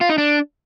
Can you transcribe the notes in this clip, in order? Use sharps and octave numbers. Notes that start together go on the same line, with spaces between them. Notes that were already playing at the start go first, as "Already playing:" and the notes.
F4
D#4
D4